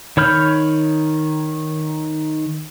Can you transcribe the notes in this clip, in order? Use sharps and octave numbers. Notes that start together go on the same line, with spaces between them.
D#3 C#5 B5 F6 G6